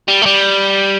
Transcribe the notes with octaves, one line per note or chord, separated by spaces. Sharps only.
G3
A3
G3